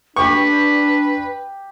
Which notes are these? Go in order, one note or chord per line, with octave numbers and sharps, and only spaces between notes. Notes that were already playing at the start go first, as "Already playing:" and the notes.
D4 G4 B4 C#6